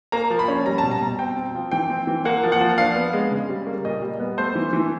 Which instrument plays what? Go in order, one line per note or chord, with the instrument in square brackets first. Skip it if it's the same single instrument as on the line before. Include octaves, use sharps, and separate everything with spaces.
[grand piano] A#3 A#5
F3
B5
C#4
G3 A#5
B2 A5
A#5
B2
C4 G5
C4
F3
E3 G5
C4
E3
A#3 F#5
F3
F#5
F3
D4 F5
B3
G#3
C#3
G3
A#3
A#2 D#5
G3
B3
A3 C5
E3
E3